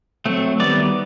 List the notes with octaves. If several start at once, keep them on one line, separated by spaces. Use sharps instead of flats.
F#3 A3 C4
D#3 G3 B3 D5